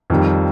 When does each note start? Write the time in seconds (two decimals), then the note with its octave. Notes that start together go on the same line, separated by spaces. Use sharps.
0.10 F2 D#3 G3